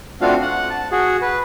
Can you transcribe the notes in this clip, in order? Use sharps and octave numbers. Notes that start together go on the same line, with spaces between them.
A3 C4 D4 F4 F#4 F5
F#5
A5
F#4 G#4
B4